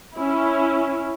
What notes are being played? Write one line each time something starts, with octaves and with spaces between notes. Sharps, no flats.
C#4 E4